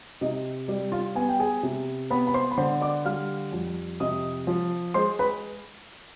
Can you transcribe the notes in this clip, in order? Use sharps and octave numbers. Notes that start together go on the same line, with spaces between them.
C3 D#4 D#5
G3 D5
F4 F5
B3 G#5
G5
G#4 G#5
C3
B3 B4 B5
B5
C5 C6
B5
D3 C5 C6
D5 D6
G3 F5 F6
F2
C3 D#5 D#6
F3
G#3 C5 C6
B4 B5